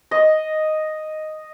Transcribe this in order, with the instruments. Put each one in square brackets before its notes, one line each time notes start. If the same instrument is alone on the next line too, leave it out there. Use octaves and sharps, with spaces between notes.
[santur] D#5